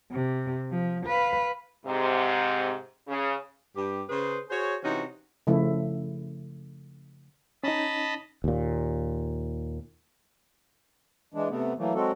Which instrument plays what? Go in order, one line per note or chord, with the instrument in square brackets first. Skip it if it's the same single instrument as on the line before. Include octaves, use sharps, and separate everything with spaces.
[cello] C3
F3
B4 F5
[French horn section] G#2 C3
C#3
[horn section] G2 G4
C#3 C#4 G#4 B4 C5
F#4 G#4 C5 C#5
C3 E3 C#4 D#4 F#4
[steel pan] C#3 F3 A3 E4
[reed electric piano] C#4 D#4 [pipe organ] D#5 A5 B5
[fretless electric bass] D#2 A#2
[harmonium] E3 G#3 D4
C3 A3 B3
E3 F#3 A3 A#3
F#3 G#3 C4 F#4 A4